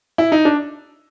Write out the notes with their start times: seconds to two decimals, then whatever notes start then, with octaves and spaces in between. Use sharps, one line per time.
0.18 E4
0.32 D#4
0.45 D4